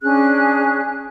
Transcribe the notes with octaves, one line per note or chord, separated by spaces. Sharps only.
C#4 D4 G#4 F#6